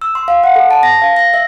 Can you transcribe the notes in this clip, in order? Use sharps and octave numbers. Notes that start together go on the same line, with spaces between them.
E6
C6
F5
F#5
A4
A5
A#6
F5
A#6
E5